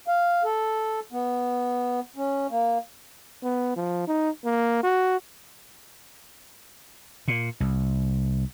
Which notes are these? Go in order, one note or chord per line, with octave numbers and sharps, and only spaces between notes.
F5
A4
B3
C#4
A#3
B3
F3
D#4
A#3
F#4
A#2
C2